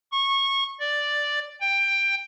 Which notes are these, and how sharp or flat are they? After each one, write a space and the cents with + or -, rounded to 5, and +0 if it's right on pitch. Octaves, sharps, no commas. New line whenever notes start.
C#6 -20
D5 +0
G5 +15